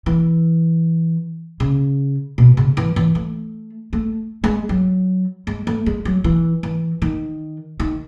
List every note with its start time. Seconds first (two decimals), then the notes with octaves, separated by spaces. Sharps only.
0.06 E3
1.60 C#3
2.38 B2
2.57 C#3
2.77 E3
2.96 E3
3.15 A3
3.93 A3
4.44 G#3
4.69 F#3
5.47 G#3
5.67 A3
5.86 G#3
6.05 F#3
6.24 E3
6.63 E3
7.02 D#3
7.80 D#3